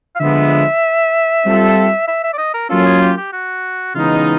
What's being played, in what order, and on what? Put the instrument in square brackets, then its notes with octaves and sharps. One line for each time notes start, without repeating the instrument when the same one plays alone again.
[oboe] F5
[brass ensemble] D3 F3 G#3 B3 [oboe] E5
[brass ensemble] G3 C4 F4 A4
[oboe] E5
E5
D5
D#5
A#4
[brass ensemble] F#3 A#3 C#4 F4 [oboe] A4
[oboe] G#4
G4
G4
F#4
[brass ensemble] C#3 E3 G#3 B3 D#4 [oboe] F4